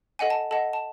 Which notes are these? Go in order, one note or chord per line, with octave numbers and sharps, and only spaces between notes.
A4 D#5 F#5 G#5
A5
A4 D#5 F#5 A5
A5